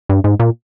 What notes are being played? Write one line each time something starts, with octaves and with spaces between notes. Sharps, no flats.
G2
G#2
A#2